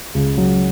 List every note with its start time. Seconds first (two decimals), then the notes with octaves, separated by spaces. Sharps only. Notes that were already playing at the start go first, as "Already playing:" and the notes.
0.15 C#2
0.37 F#3